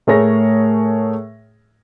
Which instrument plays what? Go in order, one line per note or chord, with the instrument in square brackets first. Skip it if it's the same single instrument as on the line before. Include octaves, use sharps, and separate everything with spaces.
[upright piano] A2 A3 G#4 A#4 C#5 A#6